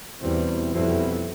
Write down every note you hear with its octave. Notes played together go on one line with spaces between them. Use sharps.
E2 B2 G3 C4 E4
F2 B2 G3 C4 E4